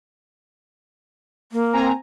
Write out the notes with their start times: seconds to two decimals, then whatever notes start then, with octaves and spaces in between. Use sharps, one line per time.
1.52 A#3
1.73 C4 G#5 A#5